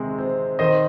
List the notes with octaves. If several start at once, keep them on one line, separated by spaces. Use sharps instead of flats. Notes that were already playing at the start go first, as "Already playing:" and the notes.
Already playing: C3 D#3 G#3
C4
D#3 C5 D#5